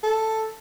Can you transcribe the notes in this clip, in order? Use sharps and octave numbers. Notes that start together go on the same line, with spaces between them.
A4